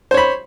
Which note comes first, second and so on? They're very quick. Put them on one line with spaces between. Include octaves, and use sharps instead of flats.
C5 C#5 B5